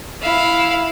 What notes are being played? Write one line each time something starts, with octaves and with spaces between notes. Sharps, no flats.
E4 F5